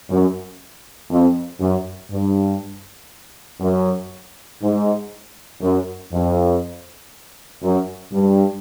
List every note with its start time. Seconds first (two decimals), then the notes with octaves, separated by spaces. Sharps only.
0.09 F#2
1.10 F2
1.60 F#2
2.10 G2
3.60 F#2
4.61 G#2
5.61 F#2
6.11 F2
7.62 F#2
8.12 G2